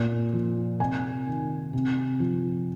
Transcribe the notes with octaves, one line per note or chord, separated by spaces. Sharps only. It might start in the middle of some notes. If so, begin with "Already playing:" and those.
Already playing: A#2 G#5
F3
C3 G#5
D#3
C3
F3